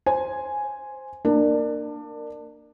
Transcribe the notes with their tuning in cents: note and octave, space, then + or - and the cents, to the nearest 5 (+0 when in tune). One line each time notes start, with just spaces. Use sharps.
C5 +0 G#5 +0
A#3 -10 D4 +20